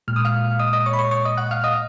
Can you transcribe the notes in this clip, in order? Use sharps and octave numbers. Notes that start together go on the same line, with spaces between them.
A#2 G#3 F6
D#6
F5 F6
D#5 D#6
D#5 D#6
C#5 C#6
B5
C#5 C#6
C#5 C#6
D#5 D#6
F#5 F#6
F5 F6
D#5 D#6